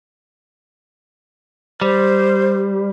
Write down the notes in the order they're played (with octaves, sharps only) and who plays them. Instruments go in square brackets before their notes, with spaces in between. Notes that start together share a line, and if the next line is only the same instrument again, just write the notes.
[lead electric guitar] G3 [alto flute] C5